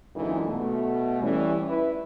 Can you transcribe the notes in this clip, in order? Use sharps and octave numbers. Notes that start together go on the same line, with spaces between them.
F#2 A#2 D3 E3 G#3 D#4
B2 A3
E3 G3 C#4
E4 B4